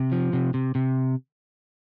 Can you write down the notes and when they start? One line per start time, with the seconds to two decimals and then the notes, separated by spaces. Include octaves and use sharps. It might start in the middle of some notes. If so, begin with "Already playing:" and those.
Already playing: C3
0.12 F3
0.33 C3
0.54 C3
0.75 C3